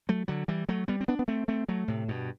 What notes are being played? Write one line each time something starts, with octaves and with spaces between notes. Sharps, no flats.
F#3 A3
D3 F#3
E3 G3
F#3 A3
G3 B3
C4
B3 D4
B3
A3 C4
A3 C4
F#3 A3
A2 C3
G2 B2